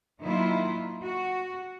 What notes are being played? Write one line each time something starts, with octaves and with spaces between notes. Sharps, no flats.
D#3 F#3 A#3 E4 F4
F#4